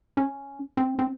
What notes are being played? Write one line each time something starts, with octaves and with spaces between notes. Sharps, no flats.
C#4
C4
C4